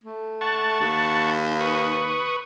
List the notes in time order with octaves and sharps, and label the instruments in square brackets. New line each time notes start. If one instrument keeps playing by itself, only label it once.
[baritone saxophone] A3
[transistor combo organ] F#5 A5 C#6
[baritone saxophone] D#2
[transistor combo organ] B4 C#6 D#6